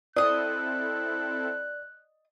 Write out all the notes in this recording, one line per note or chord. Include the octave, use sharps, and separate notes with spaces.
C4 E4 A4 D5 D#5 D#6 F#6